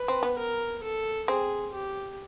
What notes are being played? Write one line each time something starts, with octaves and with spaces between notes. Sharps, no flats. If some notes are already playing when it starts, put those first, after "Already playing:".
Already playing: B4
C4
B3
A#4
A4
C4 G#4
G4